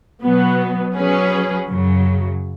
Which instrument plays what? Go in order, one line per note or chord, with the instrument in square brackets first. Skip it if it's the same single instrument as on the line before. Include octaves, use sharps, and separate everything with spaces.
[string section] B2 F#3 B3
F#3 C#4 G#4 B4
F#2 C#3 F#3